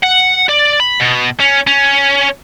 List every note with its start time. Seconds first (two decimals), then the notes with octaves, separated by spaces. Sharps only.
0.03 F#5
0.49 D5
0.80 B5
1.00 B2
1.40 C#4
1.67 C#4